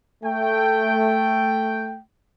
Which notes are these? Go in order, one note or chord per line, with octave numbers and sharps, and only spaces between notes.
A3 G5